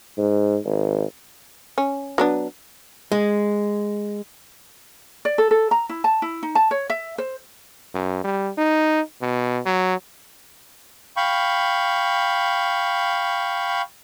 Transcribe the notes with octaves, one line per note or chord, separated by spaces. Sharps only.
G#2
G#1
C#4
F#3 B3 D4
G#3
D5
A4
A4
A#5
E4
A5
E4
D#4
A5
C#5
E5
C5
F#2
G3
D#4
B2
F#3
F5 G5 B5 C#6